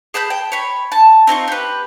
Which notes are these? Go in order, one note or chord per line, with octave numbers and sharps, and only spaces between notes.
G#4 A5 B5 G6
G5
C#5 B5
A5
C4 D#4 F4 C#6
G4 B4